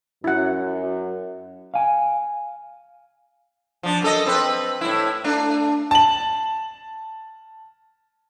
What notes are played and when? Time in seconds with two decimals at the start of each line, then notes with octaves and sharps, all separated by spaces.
0.24 F#2 E4 F#5
1.74 F5 G#5
3.83 F3 D4
4.02 F#2 A4 D#5
4.26 C4 B4
4.81 A2 E4
5.24 A3 D4
5.91 A5 F#7